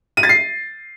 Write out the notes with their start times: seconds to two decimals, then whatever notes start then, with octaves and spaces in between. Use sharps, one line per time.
0.17 D#7
0.23 A6
0.29 C7